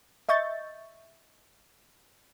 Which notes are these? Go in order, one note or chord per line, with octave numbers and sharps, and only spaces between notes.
D#5 E5 C#6 G6 A6